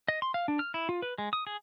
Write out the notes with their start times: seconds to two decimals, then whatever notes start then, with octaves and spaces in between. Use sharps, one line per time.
0.08 D#5
0.22 C6
0.34 F5
0.48 D4
0.59 F6
0.74 E4
0.89 F4
1.02 B4
1.18 G#3
1.33 D#6
1.47 G#4